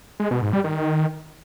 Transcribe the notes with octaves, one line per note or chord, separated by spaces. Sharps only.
G#3
B2
G#2
G3
D#3